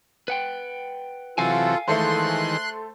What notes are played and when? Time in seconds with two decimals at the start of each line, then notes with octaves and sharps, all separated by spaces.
0.28 B4 F#5 G5
1.38 C3 E3 F#3 F4 A4 F5 G#5
1.88 D#3 E3 G#3 A3 A4 C5 C6 F#6